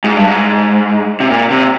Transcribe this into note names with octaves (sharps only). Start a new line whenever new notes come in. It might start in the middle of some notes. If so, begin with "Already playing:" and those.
G#2
G2
G#2
C3
A#2
C3